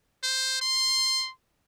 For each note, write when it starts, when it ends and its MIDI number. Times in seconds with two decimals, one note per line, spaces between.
0.23 0.57 72
0.61 1.31 84